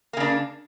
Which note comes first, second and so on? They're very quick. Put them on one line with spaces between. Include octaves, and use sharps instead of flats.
A#3 C#3 D4